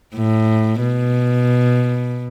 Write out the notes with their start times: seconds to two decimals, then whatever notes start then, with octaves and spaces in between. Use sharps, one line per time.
0.15 A2
0.82 B2